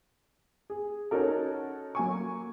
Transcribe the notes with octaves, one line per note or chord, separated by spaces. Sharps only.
G#4
C#4 D#4 F#4 A4 A#4
F#3 A#3 G#5 C#6